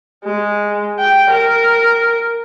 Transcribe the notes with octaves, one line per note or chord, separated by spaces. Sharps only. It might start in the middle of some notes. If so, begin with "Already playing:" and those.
G#3
G5
A#4